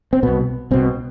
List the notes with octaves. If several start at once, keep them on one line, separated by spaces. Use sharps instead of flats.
C4
C2 B2 B3
C2 B2 C4